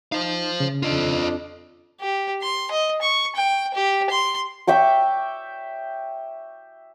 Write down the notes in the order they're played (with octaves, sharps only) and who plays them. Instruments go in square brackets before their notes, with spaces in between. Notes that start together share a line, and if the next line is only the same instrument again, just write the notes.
[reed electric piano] D#4 [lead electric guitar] C5 F5
[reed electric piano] C#3
[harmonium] F2 D4 [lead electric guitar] F4 D#5
[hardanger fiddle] G4
C6
D#5
C#6
G5
G4
C6
[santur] E5 G5 C#6 D6